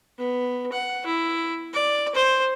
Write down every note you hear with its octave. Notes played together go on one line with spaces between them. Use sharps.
B3
F#5
E4
D5
C5